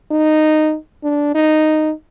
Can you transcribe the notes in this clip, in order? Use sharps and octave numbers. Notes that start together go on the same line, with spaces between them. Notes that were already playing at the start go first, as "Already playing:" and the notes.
D#4
D4
D#4